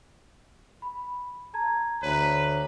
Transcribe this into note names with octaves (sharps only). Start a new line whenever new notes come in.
B5
A5 A#5 G#6
D2 B4 C#5 A#5